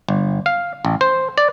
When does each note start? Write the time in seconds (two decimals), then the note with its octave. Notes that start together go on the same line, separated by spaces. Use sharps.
0.09 G1
0.46 F5
0.85 A1
1.01 C5
1.38 D5